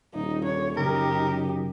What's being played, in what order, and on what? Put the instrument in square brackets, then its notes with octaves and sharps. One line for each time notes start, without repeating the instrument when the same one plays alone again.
[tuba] D#1 [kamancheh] D#4
[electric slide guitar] D4 A4 [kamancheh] C#5
[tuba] F#2 [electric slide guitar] C#3 [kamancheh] D#4 G4 [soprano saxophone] A#4